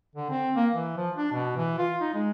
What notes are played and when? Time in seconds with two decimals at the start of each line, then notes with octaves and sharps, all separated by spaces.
0.15 D3
0.30 C4
0.55 A#3
0.74 E3
0.97 F3
1.16 D4
1.32 B2
1.57 E3
1.78 F4
2.01 D#4
2.14 G#3